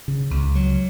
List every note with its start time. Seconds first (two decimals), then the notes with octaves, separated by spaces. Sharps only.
0.08 C#3
0.31 C#2
0.55 F#3